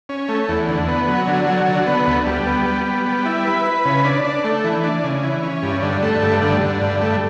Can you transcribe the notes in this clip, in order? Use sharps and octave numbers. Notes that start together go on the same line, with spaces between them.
C#4
A3
E2
D3
B3
F#3
D3
F#3
D3
B3
D2
G3
B3
G3
B3
G3
E4
B4
B4
C#3
D4
D4
A3
E3
D4
C#3
E3
C#4
G2
D3
A3
G2
D3
D3
G2
A3